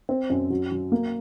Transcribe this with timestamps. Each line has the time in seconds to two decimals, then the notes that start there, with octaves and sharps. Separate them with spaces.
0.09 C4
0.30 F#2
0.50 F#3
0.72 F#3
0.92 A#3